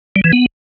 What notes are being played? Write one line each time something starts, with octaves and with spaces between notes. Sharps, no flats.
G3
E3
B3